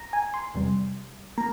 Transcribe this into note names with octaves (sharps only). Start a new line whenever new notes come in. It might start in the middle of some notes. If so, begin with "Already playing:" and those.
Already playing: A#5
G#5
C6
E2 C3 G3
A#3 A#5